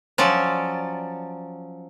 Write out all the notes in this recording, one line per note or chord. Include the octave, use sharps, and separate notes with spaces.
F3 F#3 C#4 D5